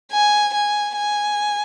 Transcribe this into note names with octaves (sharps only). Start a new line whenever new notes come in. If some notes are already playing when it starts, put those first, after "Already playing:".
G#5
G#5
G#5